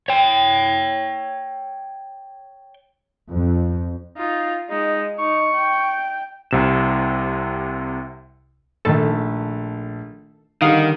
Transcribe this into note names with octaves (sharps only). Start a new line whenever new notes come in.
C#5 G5
F2
D#4 F4
G#3 D#4
D#4 C#6
G5
C2 C3 E7
A#1 D#3 A3 A4
D3 D#3 G3 F5 F#5 D#6